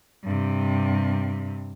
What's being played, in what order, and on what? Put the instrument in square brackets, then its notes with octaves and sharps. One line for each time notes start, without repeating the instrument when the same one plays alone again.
[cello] G2 C3